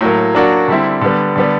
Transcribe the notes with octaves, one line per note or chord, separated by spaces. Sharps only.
A2 F#3 A#3
F#3 A#3 D4 F#4
D3 G3 C4 E4
D3 G3 B3
D3 G3 B3